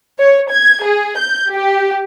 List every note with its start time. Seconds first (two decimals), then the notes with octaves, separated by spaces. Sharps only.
0.19 C#5
0.51 G#6
0.85 G#4
1.18 G6
1.52 G4